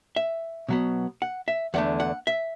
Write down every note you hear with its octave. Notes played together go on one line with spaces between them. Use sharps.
E5
B2 F#3 B3
F#5
E5
E2 D3 A3 F#5
F#5
E5